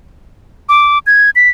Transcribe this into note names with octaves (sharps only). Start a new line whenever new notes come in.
D6
G#6
B6